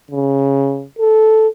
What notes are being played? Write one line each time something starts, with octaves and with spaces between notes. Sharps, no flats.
C#3
A4